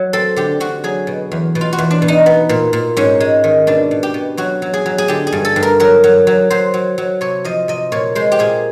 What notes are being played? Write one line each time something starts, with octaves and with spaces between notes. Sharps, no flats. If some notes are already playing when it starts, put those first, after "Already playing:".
Already playing: F#3
C4 A4
D3 G4
D3 F#4
F#3 G#4
B2
E2
B2
F4
F#4
E2
D4
B2
D#4
B3
A#2
A#2
G#2 C#4
G#3
D#3
B2 D4
B2
G4
B2
F#3 F#4
F#3
G#4
F#3
G#4
D3 G4
G#4
G2
A4
G2
A#4
F#3 A#4
F#3
F#3
F#3 C5
F#3
F#3
C3 C#5
F3 D#5
C3 D#5
A#2 C#5
G#3 C5
G4
A#2 G#4